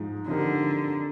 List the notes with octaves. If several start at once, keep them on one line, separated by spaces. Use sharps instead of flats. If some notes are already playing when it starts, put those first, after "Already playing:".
Already playing: G#2 F3 G#3 D#4
D3 F3 C4 D#4 G4 A#4